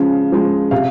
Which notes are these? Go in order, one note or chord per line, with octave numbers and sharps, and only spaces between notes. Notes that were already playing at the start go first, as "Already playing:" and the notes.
Already playing: C#3 F3 G#3
F3 G#3
C3 F5